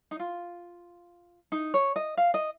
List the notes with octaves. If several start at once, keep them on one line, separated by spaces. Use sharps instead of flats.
D#4
F4
D#4
C#5
D#5
F5
D#5